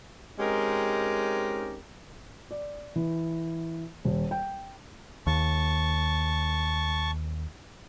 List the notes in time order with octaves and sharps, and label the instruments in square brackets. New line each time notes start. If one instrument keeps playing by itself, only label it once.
[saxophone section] G#3 C4 C#4 D#4 G4 A#4
[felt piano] D5
E3
D#1
G5
[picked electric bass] D#2 [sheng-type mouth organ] A5 C#6